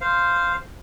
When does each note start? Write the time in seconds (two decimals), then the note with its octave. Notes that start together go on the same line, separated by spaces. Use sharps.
0.01 C5 F5